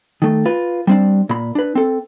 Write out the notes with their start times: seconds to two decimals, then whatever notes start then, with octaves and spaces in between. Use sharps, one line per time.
0.22 D#3 A3
0.45 F4 B4
0.87 G3 C4 D4
1.29 A#2 B5
1.55 D4 B4
1.75 C4 A4